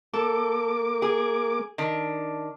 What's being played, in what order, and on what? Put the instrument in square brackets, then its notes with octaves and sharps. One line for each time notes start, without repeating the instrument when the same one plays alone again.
[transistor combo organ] A#3 D6 [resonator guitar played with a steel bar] A4
[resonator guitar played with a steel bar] G#4
D#3 D4